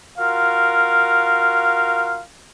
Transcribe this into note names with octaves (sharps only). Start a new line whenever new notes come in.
F4 F#4 A#4 F5